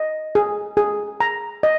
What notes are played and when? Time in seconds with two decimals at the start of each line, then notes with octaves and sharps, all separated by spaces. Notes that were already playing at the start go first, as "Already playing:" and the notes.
Already playing: D#5
0.35 G#4
0.77 G#4
1.20 A#5
1.63 D#5